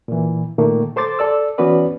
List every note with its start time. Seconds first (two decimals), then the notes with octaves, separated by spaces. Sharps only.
0.08 A#2 E3
0.58 A#2 D#3 A3 A#3
0.96 A4 C5 C6 D6 A6
1.19 A4 D5 E6
1.58 E3 B3 C#4 F#4 B4 D5